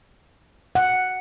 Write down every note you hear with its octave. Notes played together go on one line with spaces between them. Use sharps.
F#5